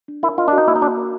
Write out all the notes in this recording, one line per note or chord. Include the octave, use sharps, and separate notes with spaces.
D4
E4 A#4
F4 D#5
D4 F#4
D#4
A#3 E4
D#4
D4 F#4
A#4